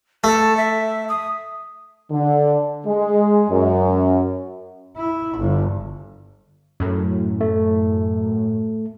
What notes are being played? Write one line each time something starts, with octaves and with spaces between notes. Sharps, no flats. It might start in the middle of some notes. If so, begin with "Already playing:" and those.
A3 A4
E5
D#6
D3
G#3
F#2
E4
G1
F#2 A2
A3